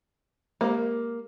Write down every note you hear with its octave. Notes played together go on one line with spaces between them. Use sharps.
G#3 A#3 G4 C5